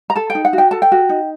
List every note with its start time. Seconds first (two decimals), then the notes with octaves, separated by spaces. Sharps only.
0.10 A#5
0.16 A4 A5
0.30 G5
0.35 D#4
0.45 F#5
0.53 F#4
0.58 G5
0.71 A4 A5
0.82 G5
0.92 F#4
1.09 D#4